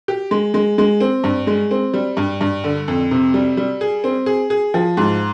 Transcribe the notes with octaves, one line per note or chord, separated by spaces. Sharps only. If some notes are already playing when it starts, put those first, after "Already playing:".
G4
G#3
G#3
G#3
C4
G2
G#3
C4
G3
G2
G2
D3
F2
C3
G3
G3
G#4
C4
G#4
G#4
F3
G#2